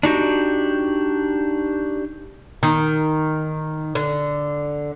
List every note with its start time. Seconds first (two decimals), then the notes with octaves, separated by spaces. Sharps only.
0.03 D4 D#4 F#4 G4
2.63 D#3
3.95 D3